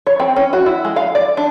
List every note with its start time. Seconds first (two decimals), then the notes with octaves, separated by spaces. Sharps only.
0.07 C#5
0.20 C4
0.36 C#4
0.53 F#4
0.66 E4
0.85 G#3
0.96 F5
1.15 D5
1.37 D4